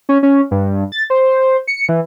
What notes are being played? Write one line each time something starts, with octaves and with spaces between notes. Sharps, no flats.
C#4
C#4
G2
A6
C5
C#7
E3